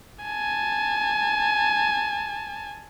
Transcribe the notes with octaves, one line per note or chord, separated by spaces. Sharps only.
G#5 A5